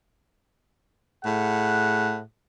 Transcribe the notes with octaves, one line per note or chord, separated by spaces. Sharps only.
A2 G#4 F#5